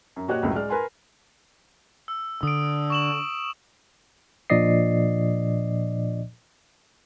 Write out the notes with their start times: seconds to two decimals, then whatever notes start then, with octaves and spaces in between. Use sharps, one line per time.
0.16 F#2
0.28 A#2 F#4 G4 C#5 D#5 F#6
0.43 C#2 A2 F#3
0.55 G#3 D5 F6
0.70 A#4 B4 G#5 C6
2.08 E6
2.43 D3 D#6 D7
2.90 C#6 E7 F#7
4.50 A#2 F3 D4 D5 D#5 C7